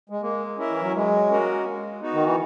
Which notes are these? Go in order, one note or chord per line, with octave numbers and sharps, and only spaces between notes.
G#3
G#3 A#3
C#4 E4 A#4 E5
E3
F#3
F#3 G#3
A#3 C#4 F#4 A#4
G#3
B3 D#4 F#4
D#3
E3